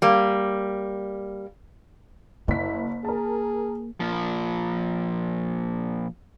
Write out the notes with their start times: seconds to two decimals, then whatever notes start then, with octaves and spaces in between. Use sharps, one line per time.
0.02 G3 A#3
2.48 F#1 A#3 E4 B6
3.05 G#4 A#4 A5
4.00 A#2 F3